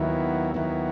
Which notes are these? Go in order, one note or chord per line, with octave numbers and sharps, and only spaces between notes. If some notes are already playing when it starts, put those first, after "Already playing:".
Already playing: D#2 D#3 F#3 B3 E4
D#2 D#3 F#3 B3 E4